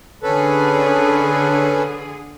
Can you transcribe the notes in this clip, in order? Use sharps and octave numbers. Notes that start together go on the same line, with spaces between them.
D3 C#4 G#4 A4 B4